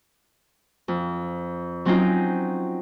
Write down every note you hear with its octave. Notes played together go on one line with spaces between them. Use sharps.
F2
F#3 C4 C#4 D#4 F4